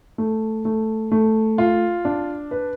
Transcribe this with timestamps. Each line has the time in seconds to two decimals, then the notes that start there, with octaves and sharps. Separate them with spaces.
0.18 A3
0.65 A3
1.11 A3
1.58 F4
2.05 D4
2.51 B4